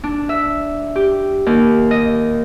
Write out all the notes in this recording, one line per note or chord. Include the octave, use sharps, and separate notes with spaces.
D4
E5
G4
D#2
D#5